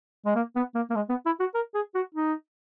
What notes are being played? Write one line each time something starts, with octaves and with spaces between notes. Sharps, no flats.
G#3
A#3
B3
A#3
A#3
G#3
B3
E4
F#4
A#4
G#4
F#4
D#4